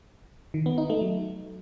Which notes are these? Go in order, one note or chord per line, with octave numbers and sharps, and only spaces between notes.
D#3
B3
D#4
A3
F#3